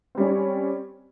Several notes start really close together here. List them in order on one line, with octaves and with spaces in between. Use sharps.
C4 G3 C#4